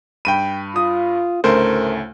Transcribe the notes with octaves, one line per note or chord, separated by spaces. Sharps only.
G2 G5 B5 D#7
F4 D#6
D2 A2 C#3 A3 A#4 C5